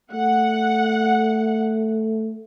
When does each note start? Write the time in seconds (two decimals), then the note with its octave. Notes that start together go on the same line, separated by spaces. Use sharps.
0.13 A3 F#5